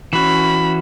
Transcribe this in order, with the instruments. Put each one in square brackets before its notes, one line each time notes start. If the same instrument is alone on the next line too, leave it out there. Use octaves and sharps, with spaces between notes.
[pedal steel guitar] E3 F#4 [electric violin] C#4 B5